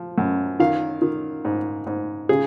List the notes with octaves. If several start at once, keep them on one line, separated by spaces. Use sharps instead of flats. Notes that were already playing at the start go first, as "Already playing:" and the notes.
Already playing: F3
F#2
D#3 F5
D#3
G#2
G#2
C#3 G#4